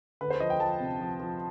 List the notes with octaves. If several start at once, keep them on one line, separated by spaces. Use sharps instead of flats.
D2 B4
C5
F3 D#5
G5
F3 A5
C3
F3
F3